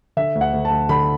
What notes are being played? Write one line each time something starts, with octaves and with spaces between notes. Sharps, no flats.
D3 E5
D2
F#5
D2
A5
D2
D3 B5